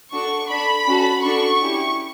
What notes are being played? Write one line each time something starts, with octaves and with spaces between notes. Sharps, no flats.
D4 F#4 A4 C#6
D4 A4 B5
C#4 F#4 A4
D4 F#4 A4 C#6
C#4 E4 G4